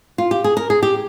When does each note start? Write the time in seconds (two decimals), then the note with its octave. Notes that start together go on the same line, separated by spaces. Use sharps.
0.18 F4
0.31 G4
0.44 G#4
0.57 A#4
0.70 G#4
0.83 G4